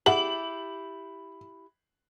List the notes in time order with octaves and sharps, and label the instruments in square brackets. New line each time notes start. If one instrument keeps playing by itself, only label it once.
[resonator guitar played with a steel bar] E4 G4 [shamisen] G#4 E5 F#5 [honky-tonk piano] F#7